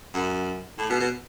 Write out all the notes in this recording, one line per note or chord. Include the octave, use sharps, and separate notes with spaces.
F#2
A2
B2
B2